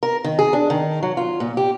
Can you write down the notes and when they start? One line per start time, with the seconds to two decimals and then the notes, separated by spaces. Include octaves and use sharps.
0.03 A#4
0.24 D#3
0.39 G#4
0.53 D4
0.70 D#3
1.03 F#3
1.17 F4
1.40 A#2
1.57 G4